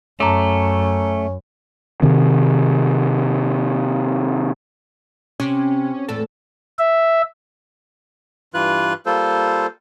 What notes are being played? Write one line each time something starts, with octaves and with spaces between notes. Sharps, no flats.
F#2 A3 C#4 A5 A#5 D6
C3 D#3 C4
C3 C#4
E2 A2 A3 A4
E5
G2 E3 F4 B4 F#6
G3 A#3 F4 A4 C5